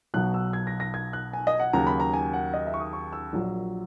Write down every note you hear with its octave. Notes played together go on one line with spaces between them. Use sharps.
B1 B2 F#3 F#6
E6
G#6
A#6
A#6
G#6
F#6
G#5
D#5
F#5
D#2 C#3 F#3 A#5
B5
A#5
G#5
F#5
D#5
E5
C#6
D#6
C#6
E6
A#1 A#2 F#3